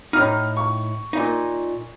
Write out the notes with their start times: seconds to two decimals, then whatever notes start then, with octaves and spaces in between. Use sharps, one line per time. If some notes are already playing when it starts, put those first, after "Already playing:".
0.13 A2 D#4 F6
0.57 C#6
1.13 A#2 D#4